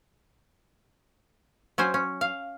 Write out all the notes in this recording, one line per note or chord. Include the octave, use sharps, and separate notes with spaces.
F#3 C#4 C5 G#5
C#4
F5